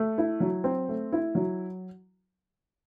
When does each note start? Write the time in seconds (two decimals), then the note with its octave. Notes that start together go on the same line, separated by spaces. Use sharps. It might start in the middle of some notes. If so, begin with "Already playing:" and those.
Already playing: A3
0.18 E4
0.40 F#3
0.64 C4
0.89 A3
1.12 E4
1.35 F#3